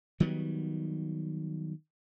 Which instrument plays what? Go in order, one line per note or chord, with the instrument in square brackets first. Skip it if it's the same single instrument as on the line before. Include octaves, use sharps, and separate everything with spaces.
[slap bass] D#3 F#3 G3 B3